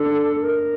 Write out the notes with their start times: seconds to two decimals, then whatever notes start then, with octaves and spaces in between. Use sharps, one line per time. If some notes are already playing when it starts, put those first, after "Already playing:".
Already playing: D4 A4
0.40 A#4